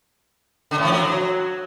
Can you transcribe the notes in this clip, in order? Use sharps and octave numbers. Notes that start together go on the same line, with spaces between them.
D3
A2
F3
F#3